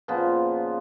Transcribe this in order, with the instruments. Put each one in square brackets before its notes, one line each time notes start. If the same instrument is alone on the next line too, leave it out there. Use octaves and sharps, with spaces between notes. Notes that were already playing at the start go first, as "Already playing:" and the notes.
[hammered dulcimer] A#2 C#3 F3 B3